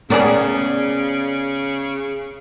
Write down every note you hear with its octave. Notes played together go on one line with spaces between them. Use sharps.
C#3 B3 G#4 A#4 D5